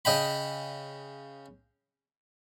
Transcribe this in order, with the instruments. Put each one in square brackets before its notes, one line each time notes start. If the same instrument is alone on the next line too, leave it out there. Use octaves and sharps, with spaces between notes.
[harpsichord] C#3 D#5 G5 B5